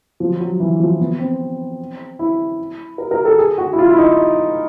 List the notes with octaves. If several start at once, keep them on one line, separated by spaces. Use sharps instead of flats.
F3
F#3
E3
F3
B3
C4
E4
A#4
A#4
A4
G#4
F#4
E4
F4
E4
D#4